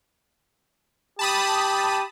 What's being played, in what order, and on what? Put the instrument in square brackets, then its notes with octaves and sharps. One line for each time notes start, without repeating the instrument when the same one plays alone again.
[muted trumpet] G4 [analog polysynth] A5 B5 D#6